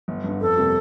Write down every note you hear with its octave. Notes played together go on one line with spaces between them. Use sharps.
G1
G2 D3
F2 A4
C3 G3 A#3